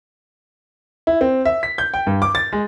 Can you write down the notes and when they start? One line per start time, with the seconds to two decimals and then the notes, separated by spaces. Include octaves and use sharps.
1.07 E4
1.21 C4
1.45 E5
1.63 B6
1.78 G6
1.94 G5
2.07 G2
2.22 D6
2.35 A6
2.53 G#3